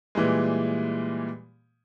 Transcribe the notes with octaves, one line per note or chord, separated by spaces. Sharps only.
A#2 E3 G3 G#3